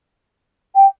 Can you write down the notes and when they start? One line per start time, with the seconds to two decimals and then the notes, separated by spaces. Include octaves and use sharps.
0.75 G5